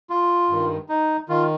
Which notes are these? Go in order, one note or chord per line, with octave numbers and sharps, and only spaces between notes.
F4
G2 D#3
D#4
D#3 F4